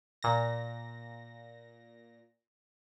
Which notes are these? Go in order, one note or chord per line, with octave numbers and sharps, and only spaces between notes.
A#2 A#6